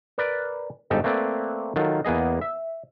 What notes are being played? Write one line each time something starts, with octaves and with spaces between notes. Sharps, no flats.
A#4 B4 D5
G1 G#2 D#4 G4 A4 A#5
A3 A#3 C4 B4 D5
D#3 F#3 F4 A4
E2 A#3 B3 G#4 D#5
E5